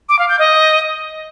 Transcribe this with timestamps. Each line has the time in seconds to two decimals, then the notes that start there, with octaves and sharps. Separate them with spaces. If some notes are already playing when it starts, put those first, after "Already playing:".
0.09 D6
0.19 F5
0.29 G6
0.39 D#5